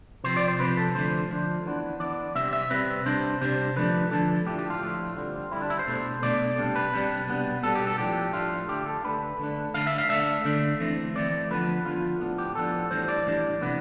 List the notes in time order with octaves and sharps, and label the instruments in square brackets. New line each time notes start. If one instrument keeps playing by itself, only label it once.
[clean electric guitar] C3 F3 C4 C5
D5
C5
C3 F3 C4 B4
A4
D3 F3 A3 D4 C5
D3 F3 A3 D4
E3 B3 D4
E3 B3 D4 D5
C3 G3 C4 E5
E5
C3 G3 C4 B4
C3 G3 D4 C5
C3 G3 D4 C5
D3 F3 A3 D4 B4
D3 F3 A3 D4 A4
A2 F3 A3 D4 G4
G4
F4
A2 F3 A3 D4
D3 G3 C4
D3 G3 C4 E4
D4
E4
C5
B2 A3 D4
B2 A3 D4 D5
C3 G3 D4
B4
C3 G3 D4
B2 G3 B3 D4
B2 G3 B3 D4 A4
G4
A4
A2 F3 A3 D4 G4
A2 F3 A3 D4 F4
D3 A3 D4 G4
A4
D3 A3 D4 B4
D3 A3 D4
D3 A3 D4 F5
E5
F5
D3 A3 D4 E5
D3 A3 D4
E3 A3 C4
E3 A3 C4 D5
D3 F3 B3 B4
D3 F3 B3 F4
A2 F3 B3 D4
G4
A2 F3 B3 D4 A4
A2 E3 G3 D4 C5
D5
A2 E3 G3 D4
C3 E3 B3 D4